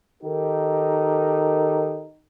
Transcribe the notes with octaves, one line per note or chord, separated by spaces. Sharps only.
D#3 D#4 G4 A4 A#4